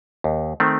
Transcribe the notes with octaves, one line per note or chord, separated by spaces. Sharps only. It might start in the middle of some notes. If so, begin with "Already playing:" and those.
D#2
D#3 A3 C4